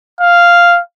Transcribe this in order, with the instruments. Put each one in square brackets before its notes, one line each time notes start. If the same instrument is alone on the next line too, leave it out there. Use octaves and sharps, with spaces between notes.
[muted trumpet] F5